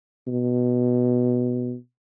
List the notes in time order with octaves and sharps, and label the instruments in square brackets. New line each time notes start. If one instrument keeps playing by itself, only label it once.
[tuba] B2